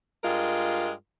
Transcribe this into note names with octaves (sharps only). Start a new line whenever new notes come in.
G2 G#3 F4 A#4